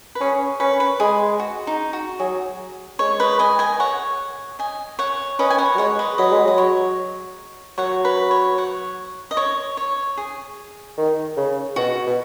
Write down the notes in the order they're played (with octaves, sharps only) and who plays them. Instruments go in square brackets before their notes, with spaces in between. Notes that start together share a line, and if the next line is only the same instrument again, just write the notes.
[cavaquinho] B4
[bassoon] C#4 [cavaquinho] G#4
[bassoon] C#4 [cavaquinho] B4
[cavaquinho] B4
[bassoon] G#3 [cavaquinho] G#4
[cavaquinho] F#4
D#4
F#4
[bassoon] F#3 [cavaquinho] G#4
[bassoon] G#3 [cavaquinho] C#5
[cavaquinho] B4 D#5
D#5 G#5
D#5 G#5
C#5 F#5
D#5 G#5
C#5 F#5
[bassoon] C#4 [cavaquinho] B4 D#5
[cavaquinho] G#5
C#5 F#5
[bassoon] F#3
[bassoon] G#3 [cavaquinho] C#5 F#5
[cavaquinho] B4 D#5
[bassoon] F#3 [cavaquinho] B4 D#5
[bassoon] G#3
[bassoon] F#3 [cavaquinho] D#5
[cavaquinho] C#5
[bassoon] F#3 [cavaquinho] C#5 F#5
[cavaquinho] B4
C#5
C#5 F#5
D#5
C#5
C#5
G#4
[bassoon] D#3
C#3
[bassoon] B2 [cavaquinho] F#4
[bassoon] B2